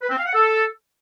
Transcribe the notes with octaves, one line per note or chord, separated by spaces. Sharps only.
B4
C4
F5
F#5
A4